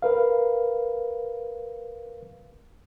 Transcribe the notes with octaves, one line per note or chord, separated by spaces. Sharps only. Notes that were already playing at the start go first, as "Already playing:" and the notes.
A#4 B4 F5